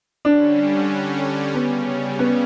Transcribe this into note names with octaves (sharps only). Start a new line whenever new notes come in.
D3 G3 C#4 D4
C#3 G3 B3 C#4
B3